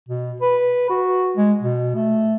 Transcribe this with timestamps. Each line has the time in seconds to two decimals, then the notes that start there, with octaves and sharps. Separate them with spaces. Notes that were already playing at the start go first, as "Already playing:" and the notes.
0.09 B2
0.41 B4
0.90 F#4
1.37 G#3
1.62 B2
1.95 A3